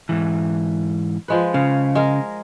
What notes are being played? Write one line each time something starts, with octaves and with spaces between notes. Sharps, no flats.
G#2 E3
F3 G#3 B4
C#3 F5
G#3 A#4